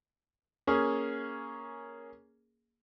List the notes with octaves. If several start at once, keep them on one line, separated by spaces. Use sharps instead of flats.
A#3 C#4 G#4